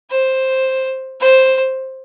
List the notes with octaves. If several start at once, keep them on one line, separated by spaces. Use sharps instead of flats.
C5
C5